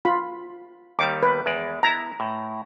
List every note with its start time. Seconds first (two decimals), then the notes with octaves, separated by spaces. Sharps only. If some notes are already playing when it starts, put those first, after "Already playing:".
0.05 F4 B5
0.99 D#2 D#3 G3 D6
1.23 B4
1.46 E2 G#3 D5
1.83 B3 E4 A5 A#5
2.20 A2